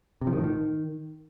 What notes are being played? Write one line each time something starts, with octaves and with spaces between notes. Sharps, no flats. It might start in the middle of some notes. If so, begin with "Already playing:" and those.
C3
F3
D#3
A2
D#3